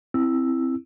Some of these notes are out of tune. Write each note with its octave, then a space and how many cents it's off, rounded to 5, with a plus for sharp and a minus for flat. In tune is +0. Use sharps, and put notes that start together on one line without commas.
C4 +0 E4 +0 E6 +0